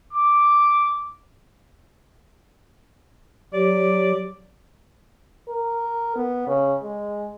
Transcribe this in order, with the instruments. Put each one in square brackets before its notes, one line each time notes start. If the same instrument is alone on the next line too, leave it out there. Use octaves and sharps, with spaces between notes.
[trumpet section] D6
[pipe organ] F#3 G4 [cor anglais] D5
[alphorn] A#4
B3
C#3
G#3